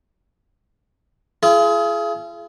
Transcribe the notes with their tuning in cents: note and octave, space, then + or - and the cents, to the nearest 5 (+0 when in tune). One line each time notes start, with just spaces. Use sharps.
F4 -40 G#4 +25